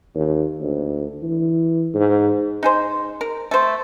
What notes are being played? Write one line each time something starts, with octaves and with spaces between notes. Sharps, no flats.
D#2
D2
E3
G#2
D#4 G#4 C5
A#4
A3 C5